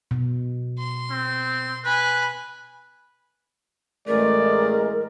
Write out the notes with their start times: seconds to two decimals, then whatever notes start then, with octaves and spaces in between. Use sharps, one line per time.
0.11 B2
0.79 C6
1.10 C4
1.85 B4 G#5 B5
4.08 A1 G#3 A3 A#4 D5